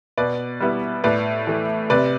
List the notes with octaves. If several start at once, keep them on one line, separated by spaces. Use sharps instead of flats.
B2 B4 D5
G3 B3 E4
A2 B4 D5
E3 A3
C3 B4 D5